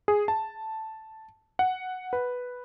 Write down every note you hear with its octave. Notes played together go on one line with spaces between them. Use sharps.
G#4
A5
F#5
B4